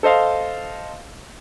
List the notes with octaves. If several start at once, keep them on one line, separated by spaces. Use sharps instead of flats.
A4 C5 D#5 F5